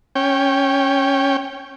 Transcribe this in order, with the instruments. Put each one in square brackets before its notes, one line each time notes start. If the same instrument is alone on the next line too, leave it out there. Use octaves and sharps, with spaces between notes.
[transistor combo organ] C#4 G5